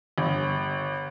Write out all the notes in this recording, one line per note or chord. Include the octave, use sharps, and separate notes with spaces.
G1